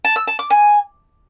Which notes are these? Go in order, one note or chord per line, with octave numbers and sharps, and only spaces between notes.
A5
E6
A5
D6
G#5